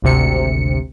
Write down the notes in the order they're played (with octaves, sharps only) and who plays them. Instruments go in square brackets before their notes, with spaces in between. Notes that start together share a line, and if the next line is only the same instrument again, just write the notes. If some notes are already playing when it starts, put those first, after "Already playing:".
[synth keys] G#1 D2 C3 C#7